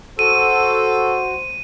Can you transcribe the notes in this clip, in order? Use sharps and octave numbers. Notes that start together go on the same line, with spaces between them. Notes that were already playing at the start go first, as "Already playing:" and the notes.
F#4 A4 C5 D#7